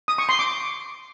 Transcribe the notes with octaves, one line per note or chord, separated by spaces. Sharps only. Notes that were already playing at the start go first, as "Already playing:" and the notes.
D#6
C#6
C6
D6